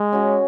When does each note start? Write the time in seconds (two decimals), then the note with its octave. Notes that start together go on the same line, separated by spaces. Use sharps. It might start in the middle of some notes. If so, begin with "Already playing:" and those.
Already playing: G#3
0.12 C#4 F#4